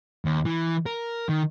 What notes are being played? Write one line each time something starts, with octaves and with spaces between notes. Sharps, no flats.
D#2
E3
A#4
D#3